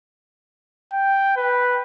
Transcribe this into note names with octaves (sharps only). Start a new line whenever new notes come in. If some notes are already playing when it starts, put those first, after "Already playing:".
G5
B4